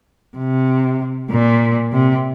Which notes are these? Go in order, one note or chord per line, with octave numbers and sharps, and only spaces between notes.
C3
A#2
C3